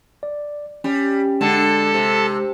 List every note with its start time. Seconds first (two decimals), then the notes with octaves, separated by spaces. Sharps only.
0.23 D5
0.84 G3 C#4
1.41 D3 G#3 A4 A5
1.94 C3